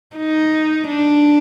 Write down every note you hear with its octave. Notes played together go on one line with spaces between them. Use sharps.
D#4
D4